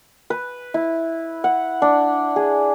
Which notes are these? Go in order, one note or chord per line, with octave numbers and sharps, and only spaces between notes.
B4
E4
F#5
D4
G#4